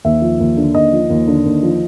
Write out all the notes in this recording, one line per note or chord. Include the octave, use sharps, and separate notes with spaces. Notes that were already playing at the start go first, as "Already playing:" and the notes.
D#2 E5
F3
D#2
D3
D#2 D#5
F3
D#2
D3
D#2
F3